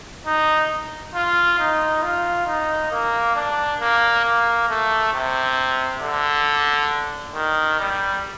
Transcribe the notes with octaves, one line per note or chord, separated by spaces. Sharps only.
D#4
F4
D#4
F4
D#4
A#3
D4
A#3
A#3
A3
C3
D3
D#3
G3